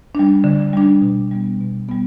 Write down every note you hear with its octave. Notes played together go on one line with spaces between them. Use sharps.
G3 D4
D3
G3 D4
B2
G3 B3
B2
G3 B3